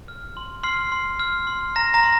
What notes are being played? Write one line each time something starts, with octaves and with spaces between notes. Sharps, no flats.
F6
C6
C6 F6 C7
C6
F6
C6
A#5 F6 A#6
A#5 A#6
C6